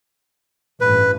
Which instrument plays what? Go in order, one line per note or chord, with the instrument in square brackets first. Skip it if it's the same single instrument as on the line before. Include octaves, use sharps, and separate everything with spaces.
[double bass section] A1 G2 [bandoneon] B4